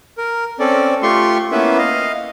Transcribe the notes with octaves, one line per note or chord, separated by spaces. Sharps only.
A#4
C4 C#4 A4 D5
A3 F4 G4 C6 C#6
A#3 B3 C#4 E4 B4 E5
D#5 F5